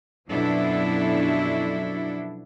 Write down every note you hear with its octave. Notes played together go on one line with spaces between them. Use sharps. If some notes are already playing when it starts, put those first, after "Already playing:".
F#2 B2 F3 D4 E4 A4